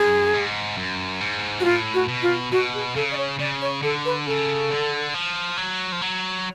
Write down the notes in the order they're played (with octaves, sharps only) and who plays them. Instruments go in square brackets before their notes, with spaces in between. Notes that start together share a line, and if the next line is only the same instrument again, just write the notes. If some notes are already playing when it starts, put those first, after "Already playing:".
Already playing: [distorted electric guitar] F#2 [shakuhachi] G#4
[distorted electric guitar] G#2
F#2
G#2
[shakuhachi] F#4
[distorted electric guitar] A2 [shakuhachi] F4
[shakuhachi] F#4
[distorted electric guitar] B2
[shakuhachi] F4
[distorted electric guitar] B2 [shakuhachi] F#4
[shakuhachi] G#4
[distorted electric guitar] C#3 [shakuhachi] A4
[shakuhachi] D5
C#5
[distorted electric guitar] C#3 [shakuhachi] D5
[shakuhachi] C#5
[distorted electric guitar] D3 [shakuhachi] A4
[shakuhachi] B4
[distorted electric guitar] C#3 [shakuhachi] A4
[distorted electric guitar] D3
F3
F#3
F3
F#3